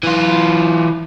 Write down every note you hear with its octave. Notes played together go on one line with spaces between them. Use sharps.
E3 F4